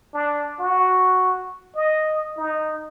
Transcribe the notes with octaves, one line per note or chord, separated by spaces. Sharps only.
D4
F#4
D#5
D#4